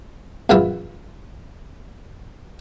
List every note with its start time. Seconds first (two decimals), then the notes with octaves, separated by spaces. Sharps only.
0.49 A#1 F#2 E3 F4 B4 E5